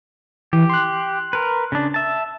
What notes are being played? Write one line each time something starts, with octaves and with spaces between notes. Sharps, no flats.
E3 G4
C6 F#6
A#4 B4
C#3 D4
E5 A5